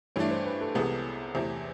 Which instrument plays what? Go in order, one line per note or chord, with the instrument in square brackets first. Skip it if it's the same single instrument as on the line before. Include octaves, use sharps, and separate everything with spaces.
[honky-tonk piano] G2 E3 A3 D4 [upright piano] C#5
[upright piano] C5
B4
A4
[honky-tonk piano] C2 C3 E3 G#3 B3 [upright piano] G#4
[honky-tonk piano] E2 C3 E3 A3 C4